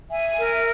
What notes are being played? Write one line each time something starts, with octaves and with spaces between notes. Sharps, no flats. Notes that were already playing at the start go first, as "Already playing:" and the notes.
E5 G#5
A#4